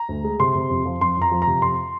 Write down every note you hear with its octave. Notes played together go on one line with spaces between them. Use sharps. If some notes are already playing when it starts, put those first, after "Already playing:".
Already playing: A#5
D2
G#3
C3 C6
C3
F2
F3
F2 C6
F2 A#5
F3
A#5
C3
F2 C6